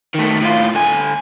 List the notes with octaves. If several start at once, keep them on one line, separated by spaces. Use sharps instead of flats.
D#3 A3
A2 F4
D3 G#5